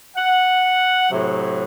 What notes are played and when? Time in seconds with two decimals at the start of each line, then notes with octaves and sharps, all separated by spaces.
0.15 F#5
1.09 A2 C3 F#3